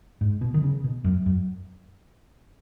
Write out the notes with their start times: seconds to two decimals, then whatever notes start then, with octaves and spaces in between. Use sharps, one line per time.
0.21 G#2
0.41 B2
0.54 D#3
0.63 C#3
0.84 B2
1.04 F#2
1.26 F#2